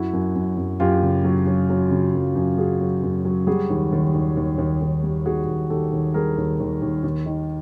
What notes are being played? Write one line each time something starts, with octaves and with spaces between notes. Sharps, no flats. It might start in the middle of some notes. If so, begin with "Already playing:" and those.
Already playing: F#2 E4 F#4
F#2
F#2
F#2
F#2 F4 G4
C#3
F#3
F#3
F#3
C#3
F#2
F#2
C#3 F#4 G#4
F#3
F#2
F#3
G3 F#4 G#4
D#2
D#2
D#2
D#2
D#2
D#2
G3
D#2 F#4 G#4
D#2
D#2 G4 A4
D#2
G3 G#4 A#4
D#2
D#2
D#2
D#2
D#3